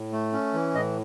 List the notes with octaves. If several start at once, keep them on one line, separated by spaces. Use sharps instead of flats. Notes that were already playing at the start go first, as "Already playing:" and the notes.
Already playing: A2
A3
C#4
E3
A2 D#5